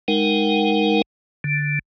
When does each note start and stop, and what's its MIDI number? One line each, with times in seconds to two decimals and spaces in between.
0.08 1.02 56
0.08 1.02 63
0.08 1.02 70
0.08 1.02 78
0.08 1.02 79
1.44 1.79 50